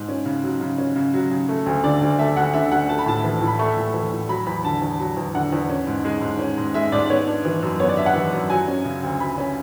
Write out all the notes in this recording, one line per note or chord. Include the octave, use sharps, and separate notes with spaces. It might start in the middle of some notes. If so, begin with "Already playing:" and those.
Already playing: G#2
C#4
C#3
F#3
C#3
C#4
C#3
F#3
C#3
A3
D2
D3 D5
D2
A3 E5
D2 F#5
D3 E5
D2 F#5
A3 A5
B5
A2 A5
E3
A2
B5
A3 C#6
A2
E3
A2
F#3 B5
E2 B5
D3 A5
E2
F#3
E2
D3 F#5
E2
C#4
G#2
G#3
G#2
C#4
G#2
G#3 E5
G#2 D5
B3 C#5
D4
E3
F#2
B3 C#5
D5
D4 E5
F#5
E3
F#2
F#3 G#5
C#4
C#3
D2
F#3 B5
C#4